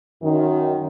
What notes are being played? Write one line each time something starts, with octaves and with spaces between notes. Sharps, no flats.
F#2 D#3